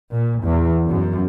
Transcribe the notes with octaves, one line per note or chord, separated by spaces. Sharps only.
A#2
E2
F#2